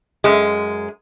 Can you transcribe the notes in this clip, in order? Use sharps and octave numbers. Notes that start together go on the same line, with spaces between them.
F#2 G#3